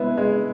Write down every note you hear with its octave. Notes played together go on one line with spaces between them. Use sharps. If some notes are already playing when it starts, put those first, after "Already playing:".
Already playing: G#3 B3 E4
G#3